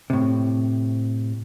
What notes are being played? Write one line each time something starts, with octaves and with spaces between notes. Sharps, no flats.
A2 C3